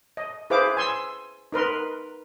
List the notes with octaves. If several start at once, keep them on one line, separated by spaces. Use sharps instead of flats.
D#5
E4 G#4 B4 C5 F5 D6
G#5 C6 E6
D#4 A#4 B4 C6